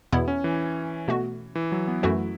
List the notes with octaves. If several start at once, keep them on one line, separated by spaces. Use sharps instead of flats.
E2 B2 B3 E4
C#4
E3
B2 A3 F#4
E3
F#3
B3
F#2 E3 A3 E4 F#4